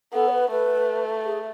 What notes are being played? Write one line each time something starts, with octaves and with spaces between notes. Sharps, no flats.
B3 A4
C#5
B4
A3 B4
G#4